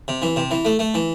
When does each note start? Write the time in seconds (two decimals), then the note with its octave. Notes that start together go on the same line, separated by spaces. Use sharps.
0.08 C3
0.22 E3
0.36 C3
0.51 E3
0.65 A3
0.79 A3
0.94 E3